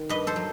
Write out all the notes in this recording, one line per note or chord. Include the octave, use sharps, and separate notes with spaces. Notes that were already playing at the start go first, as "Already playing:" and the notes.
Already playing: D#3
G2 B4 D#5
A4 C5
F#3